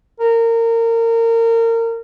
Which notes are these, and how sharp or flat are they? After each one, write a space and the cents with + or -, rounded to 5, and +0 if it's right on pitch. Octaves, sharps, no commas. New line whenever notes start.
A#4 -25